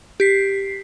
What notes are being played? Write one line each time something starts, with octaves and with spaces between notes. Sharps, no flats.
G4 B6 C7